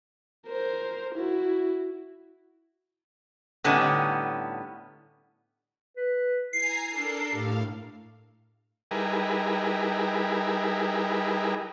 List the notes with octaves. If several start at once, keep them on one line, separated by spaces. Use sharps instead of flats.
A#4 C5
E4 F#4
A2 D3 G3 B3 C#4 D#4
B4
E4 G#5 A#5 C7
D4 A4 A#4
A2 G4 F5
G3 D#4 E4 G#4 A#4 B4